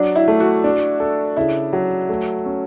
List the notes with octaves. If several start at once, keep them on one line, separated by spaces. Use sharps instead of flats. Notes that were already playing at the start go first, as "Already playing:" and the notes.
Already playing: F#3 D4
E4
A3
F#4
D4
A4
C#3 E4
F#3
A3
C#4